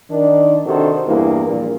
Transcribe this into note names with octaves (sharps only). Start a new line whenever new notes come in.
D#3 D4
C3 D#3 D4 F#4 A4 C5
E2 G2 E3 A#3
A#1 A#2